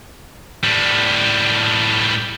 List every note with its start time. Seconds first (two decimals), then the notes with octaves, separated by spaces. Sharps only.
0.64 A2 G3